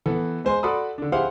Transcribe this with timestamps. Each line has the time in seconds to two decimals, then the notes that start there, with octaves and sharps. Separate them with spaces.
0.06 E3 B3 A4
0.44 G#3 C5 G#5 C6
0.63 F#4 A4 D5 B5 C6 D#6
0.98 D3 D4
1.12 E4 G4 G#4 C5 F5 F#5